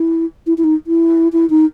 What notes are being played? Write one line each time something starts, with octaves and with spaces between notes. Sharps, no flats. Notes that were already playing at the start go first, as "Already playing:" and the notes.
Already playing: E4
E4
E4
D#4
E4
E4
D#4